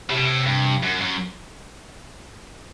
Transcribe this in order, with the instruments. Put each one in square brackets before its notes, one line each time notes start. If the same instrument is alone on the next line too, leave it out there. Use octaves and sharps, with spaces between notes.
[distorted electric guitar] A2 [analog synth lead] C3
[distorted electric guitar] B2
A2
G2
F#2
F#2